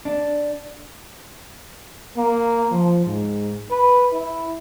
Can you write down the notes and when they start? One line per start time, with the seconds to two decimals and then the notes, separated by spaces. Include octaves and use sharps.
0.05 D4
2.17 A#3
2.72 F3
3.06 G#2
3.71 B4
4.13 E4